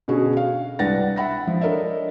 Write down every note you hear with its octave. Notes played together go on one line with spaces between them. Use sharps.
B2 D3 C#4 F#4 G#4
F5
C2 D4 B4 F#5 A6 A#6
E5 F#5 B5 A#6
F3
D4 A4 A#4 C#5 D#5 E5